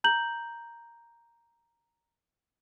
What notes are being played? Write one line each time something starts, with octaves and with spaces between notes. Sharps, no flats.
A#5 G6 F#7